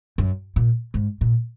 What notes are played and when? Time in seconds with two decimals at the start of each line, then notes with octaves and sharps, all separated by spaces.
0.18 F#2
0.56 A#2
0.94 G#2
1.21 A#2